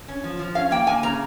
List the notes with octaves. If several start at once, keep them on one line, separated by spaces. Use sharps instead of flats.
C#4
F3
F3
C#4 F5
A#3 G5
A#3 G#5
C#3 A#5